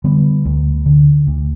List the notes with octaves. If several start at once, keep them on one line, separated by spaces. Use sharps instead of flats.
D3 G3 B3
D2
D3
D2